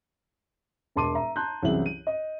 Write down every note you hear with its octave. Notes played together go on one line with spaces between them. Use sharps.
E1 A#4 A5 C6 D6 D#7
E5 A#5
A5 A#5 C6 F#6 G6
C2 F#2 E3 G#4 E5 F#7
D#7
D#5